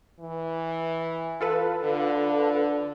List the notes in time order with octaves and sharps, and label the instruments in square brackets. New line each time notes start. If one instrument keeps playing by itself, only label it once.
[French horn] E3
[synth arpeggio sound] F4 A4 B4
[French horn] D3